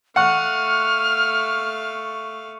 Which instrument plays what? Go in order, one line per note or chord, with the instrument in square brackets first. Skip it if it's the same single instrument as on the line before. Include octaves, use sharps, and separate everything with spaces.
[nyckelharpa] A3 F5 [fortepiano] F#5 [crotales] C#6 C#7 [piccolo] F6